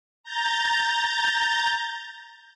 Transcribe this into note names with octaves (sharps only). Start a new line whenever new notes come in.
A#5 G6 A6